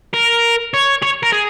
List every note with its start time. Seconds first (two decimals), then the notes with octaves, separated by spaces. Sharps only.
0.13 A#4
0.74 C#5
1.03 C#5
1.23 A#4
1.32 G#4